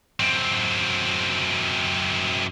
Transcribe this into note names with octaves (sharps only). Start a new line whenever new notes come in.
F#2 C4